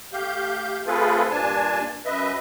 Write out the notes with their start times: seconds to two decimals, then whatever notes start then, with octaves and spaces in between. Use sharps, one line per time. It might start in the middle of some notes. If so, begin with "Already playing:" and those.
0.13 A3 G4 F5 G6
0.87 A3 C4 F4 G#4 A4 B4
1.31 G2 A#2 D4 G#5 A5
2.05 F#2 B4 D#5 E5